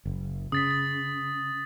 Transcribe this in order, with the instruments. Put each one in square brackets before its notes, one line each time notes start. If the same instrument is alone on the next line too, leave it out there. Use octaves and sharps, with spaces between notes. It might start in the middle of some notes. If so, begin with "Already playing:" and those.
[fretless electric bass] F#1
[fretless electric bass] C#3 [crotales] D#6 A6 B6
[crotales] A6